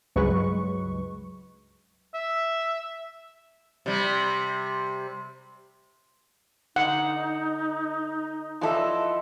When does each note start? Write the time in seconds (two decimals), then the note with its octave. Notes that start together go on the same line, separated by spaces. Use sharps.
0.16 C#2 G2 F#3 G#3 B4 C#6
2.14 E5
3.86 C3 G3
6.76 D3 D#4 F#5
8.61 E3 F3 A4 D#5 E5